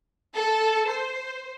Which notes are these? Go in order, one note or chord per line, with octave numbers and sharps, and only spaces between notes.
A4
C5